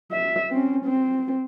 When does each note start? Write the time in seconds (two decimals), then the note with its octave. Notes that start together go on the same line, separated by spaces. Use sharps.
0.12 E5
0.50 C4 C#4
0.85 C4